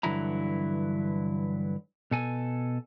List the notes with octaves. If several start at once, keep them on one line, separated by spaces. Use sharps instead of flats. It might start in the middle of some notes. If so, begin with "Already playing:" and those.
G2 D3 E3 F#3 E4 A#5
B2 A4 G#5